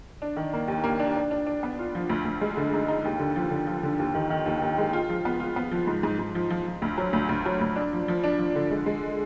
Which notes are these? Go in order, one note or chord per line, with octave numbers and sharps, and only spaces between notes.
D4
D#3
A#3
D#2
A#3
D4
D4
D4
D4
B3
F4
F3
D2
D2
G#3
D3
D#4
D#4
D#2
D3
F3
D3
F3
D3
D#2
D#3
D#3
D#2
D#2
G#3
F4
F3
B3
F4
B3
F3
G#2
G#2
G#2
F3
F3
F3
D2
F#3
D2
D2
F#3
D2
D4
F3
F3
D4
F3
D3
G#3
G#3